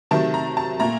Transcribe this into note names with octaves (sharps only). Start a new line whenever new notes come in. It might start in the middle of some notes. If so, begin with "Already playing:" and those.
C3 D#3 F#3 A3 A5
A#5
A5
A#2 A3 A#5